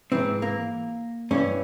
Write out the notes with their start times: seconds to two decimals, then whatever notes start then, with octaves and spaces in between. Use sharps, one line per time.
0.12 G#2 E3 C4
0.42 A#3
1.31 G2 E3 C#4